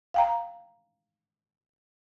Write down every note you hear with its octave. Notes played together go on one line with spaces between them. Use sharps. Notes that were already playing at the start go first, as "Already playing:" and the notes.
F5 G5 A#5